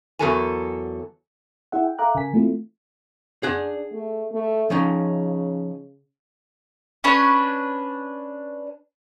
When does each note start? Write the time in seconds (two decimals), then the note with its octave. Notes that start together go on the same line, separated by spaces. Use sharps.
0.19 E2 E3 F#3 A4 A#4 G#5
1.72 E4 G#4 E5 F#5
1.84 G5
1.98 A4 E5 F5 A#5 D6 F#6
2.15 C#3 A#4 G#5 B6
2.33 E3 A3 C4 E4 F4
3.43 D4 G#4 F#5
3.92 A3
4.31 A3
4.70 C#3 F3 C#4 D#4
7.04 C#4 D4 B4 F#6